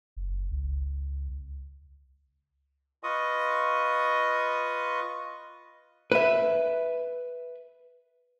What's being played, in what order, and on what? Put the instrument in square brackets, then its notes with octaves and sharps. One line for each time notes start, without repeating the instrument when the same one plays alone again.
[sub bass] F#1
C#2
[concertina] F4 B4 D#5 C#6 D#6
[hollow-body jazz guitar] B4 E5